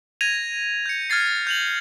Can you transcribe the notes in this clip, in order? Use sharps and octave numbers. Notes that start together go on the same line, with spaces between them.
G#6 A#6 D#7 F7
G6 C#7
F6 G#6 A6 C7
G6 F7 F#7